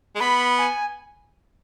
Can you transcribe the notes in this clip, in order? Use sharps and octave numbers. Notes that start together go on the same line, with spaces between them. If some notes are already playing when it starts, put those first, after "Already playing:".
G#3
B3 B5
G#5